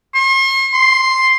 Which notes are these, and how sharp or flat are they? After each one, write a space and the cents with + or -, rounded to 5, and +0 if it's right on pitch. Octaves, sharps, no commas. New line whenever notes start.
C6 +45
C6 +5